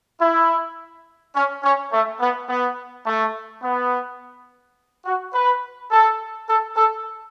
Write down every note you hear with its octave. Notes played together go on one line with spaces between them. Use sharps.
E4
C#4
C#4
A3
B3
B3
A3
B3
F#4
B4
A4
A4
A4